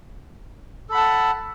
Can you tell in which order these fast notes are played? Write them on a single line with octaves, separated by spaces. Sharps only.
A4 B5 F#5 A5